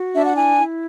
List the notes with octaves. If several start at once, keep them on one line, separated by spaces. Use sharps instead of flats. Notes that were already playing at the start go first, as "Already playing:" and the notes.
Already playing: F#4
D4 E5
F#5
E4 G#5
E4